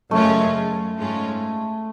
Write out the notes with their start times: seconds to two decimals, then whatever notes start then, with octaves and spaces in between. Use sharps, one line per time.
0.11 F#2 C#3 G#3 A3 C#4 F4
0.97 G#2 G#3 C#4 F4